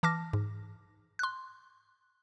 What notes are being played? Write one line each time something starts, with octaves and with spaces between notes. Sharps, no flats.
E3 A5 D6 F6 A#6
G#2
C6 F#6